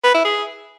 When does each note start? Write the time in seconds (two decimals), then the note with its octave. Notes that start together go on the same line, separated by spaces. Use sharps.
0.04 B4
0.15 E4
0.25 G#4